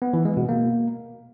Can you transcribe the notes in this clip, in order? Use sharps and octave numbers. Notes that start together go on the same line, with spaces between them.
B3
E3
G#3
B2
A#3